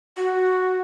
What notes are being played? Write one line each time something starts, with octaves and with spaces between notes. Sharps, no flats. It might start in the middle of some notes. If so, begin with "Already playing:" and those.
F#4